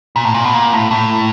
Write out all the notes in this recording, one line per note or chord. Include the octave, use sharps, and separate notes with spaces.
A#2
A2
A#2
B2
A#2
A2
A2